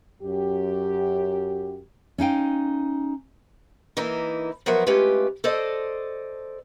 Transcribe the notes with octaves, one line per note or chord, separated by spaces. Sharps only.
F#2 G4
C#4 D#4 F5 G5
E3 A#3 D#4 E4
F3 F#3 B3 A#4 B4 E5
G#3 A3 C#4 F4 G4 B4
A4 C5 D5 D#5